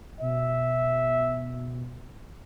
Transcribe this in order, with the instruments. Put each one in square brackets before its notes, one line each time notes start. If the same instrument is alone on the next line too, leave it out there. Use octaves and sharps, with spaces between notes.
[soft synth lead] B2 [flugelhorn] E5